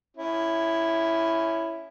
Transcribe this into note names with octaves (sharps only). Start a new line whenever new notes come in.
C#4 E4